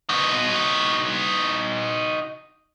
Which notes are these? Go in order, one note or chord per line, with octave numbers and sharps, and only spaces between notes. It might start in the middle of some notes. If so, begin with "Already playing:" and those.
D#4 F#4